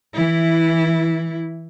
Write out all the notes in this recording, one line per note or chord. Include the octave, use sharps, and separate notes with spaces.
E3 E4